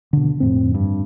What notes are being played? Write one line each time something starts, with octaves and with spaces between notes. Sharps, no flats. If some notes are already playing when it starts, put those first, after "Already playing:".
B2 D3
F2 A2 C4
G2